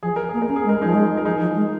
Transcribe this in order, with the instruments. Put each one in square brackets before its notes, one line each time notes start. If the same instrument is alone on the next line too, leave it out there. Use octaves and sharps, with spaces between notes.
[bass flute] F3 [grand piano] G#4
[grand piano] A#4
[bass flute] A#3 [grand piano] G#4
[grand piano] A#4
[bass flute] C#4
[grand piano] G#4
[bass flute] G#3
[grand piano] A#4
[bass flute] F3 [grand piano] D#4 G#4
[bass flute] G#3
[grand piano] A#4
[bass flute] F3 [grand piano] D#4 G#4
[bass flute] F3
G#3